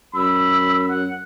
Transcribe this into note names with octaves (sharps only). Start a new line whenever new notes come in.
F#2 B5 E6
F#5